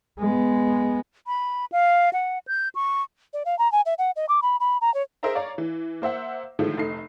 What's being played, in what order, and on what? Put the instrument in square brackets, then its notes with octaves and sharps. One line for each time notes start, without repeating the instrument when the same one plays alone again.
[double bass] G#3 B3
[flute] B5
F5
F#5
G6
C#6
[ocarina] D5
F5
A#5
G#5
E5
F#5
D#5
D6
B5
B5
A#5
C#5
[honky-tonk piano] G#4 A#4 C5 D#5 E5 A#5
C#5 D5 F5 A#5
E3
A#3 C5 E5 F#5
A2 D3 D#3 F3 G#3 A3
F1 A3 D#4 C7